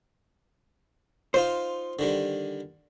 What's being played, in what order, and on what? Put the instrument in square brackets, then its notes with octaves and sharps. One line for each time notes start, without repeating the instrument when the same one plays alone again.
[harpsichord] D#4 F4 F5 [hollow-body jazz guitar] C5
[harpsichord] D3 D#3 G3